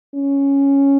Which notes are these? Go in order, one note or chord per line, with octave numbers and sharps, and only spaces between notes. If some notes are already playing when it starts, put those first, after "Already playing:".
C#4